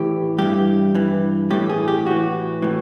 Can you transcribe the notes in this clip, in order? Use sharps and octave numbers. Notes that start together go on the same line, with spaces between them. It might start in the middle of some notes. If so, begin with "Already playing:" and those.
Already playing: A2 E3 G4
G2 E3 G4
G2 E3
A2 E3 G4
G#4
G4
A2 E3 F#4
A2 E3